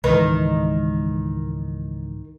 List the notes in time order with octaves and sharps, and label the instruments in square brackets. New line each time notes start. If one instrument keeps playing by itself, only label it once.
[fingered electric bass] C#2 G#2 E3 [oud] D#3 [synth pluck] B4